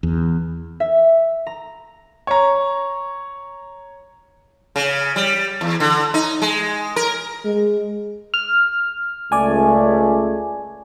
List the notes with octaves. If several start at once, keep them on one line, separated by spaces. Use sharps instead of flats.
E2
E5
A#5
C#5 A#5
C#3
G3
E2
D3
D#4
G#3
A#4
G#3
F6
C#2 A3 D5 G#5